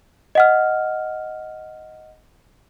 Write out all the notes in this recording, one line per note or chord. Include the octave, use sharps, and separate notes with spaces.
D#5 F#5 F6